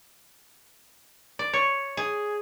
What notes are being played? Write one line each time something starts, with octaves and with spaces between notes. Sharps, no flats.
D5
C#5
G#4